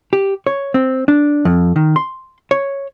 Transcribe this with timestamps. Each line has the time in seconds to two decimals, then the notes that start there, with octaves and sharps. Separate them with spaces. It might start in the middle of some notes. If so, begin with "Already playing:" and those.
0.13 G4
0.47 C#5
0.74 C4
1.08 D4
1.45 F2
1.76 D#3
1.96 C6
2.51 C#5